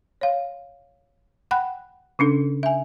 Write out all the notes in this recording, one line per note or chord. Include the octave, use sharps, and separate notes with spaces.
C#5 F5
F#5 G5 B5 F#6
C#3 C#4 D4 A4
E5 G#5